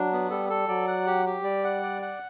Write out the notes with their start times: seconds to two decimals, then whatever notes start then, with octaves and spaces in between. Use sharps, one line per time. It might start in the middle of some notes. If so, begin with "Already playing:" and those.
Already playing: F#3 D4
0.12 B3
0.30 G3 A4
0.50 A4
0.68 F#3 D5
0.87 F#5
1.06 G4
1.26 G4
1.44 G3 D5
1.64 F#5
1.83 D5
2.02 F#5